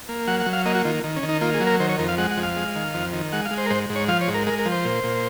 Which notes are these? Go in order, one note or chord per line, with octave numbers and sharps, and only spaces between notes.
A#3
F#3 F#5
F#5
F#3
F5
A#3 D#5
F#4
D#3 F4
D#3
C#4
D#3
D#4
A#3 F4
G#4
F#3
A#4
D#3 C5
C#5
F2 A#4
F5
G#3 F#5
F#5
F2
F5
G#3
D#3
F2
D#3
G#3 F#5
F5
G#3
C5
A#4
G#2 C5
G#2
C#5
F3 F5
C#5
G#2
A#4
G#3 A#4
A#4
F3
C5
A#2
A#2